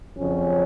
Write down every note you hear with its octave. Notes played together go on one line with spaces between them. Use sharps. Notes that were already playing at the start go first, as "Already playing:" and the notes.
F2 C#3 F#3 C#4